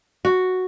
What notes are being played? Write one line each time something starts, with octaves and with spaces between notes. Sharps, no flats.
F#4